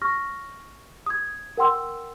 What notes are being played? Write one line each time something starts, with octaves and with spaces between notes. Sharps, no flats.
C#6 F6 A#6
D#6 G#6
A#4 F#5 G5 C6 E6